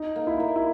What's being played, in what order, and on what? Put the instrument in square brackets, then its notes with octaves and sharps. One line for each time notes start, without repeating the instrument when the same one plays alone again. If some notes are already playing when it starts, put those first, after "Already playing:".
Already playing: [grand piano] D#4
[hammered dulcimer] A#3
[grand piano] E4
[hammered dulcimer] A#3
[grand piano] E4